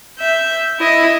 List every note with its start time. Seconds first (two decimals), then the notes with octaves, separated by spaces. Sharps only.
0.18 E5 G6
0.78 E4 D#5